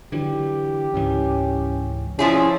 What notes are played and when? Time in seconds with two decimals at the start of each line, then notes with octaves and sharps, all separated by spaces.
0.12 D3 E3 F#3 G4
0.94 C#2 G#2 E3 C#4
2.19 F3 C#4 E4 G#4